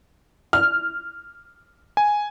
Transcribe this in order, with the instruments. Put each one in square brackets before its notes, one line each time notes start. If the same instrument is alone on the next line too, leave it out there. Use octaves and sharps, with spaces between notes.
[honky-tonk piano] F6
[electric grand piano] G#5